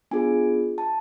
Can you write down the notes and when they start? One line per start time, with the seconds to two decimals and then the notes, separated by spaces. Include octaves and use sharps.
0.11 B3 D4 F4 G#4 G#5
0.78 A5